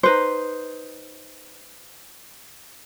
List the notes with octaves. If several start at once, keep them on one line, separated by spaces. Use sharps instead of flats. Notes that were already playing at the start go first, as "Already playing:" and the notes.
D#4 B4 C5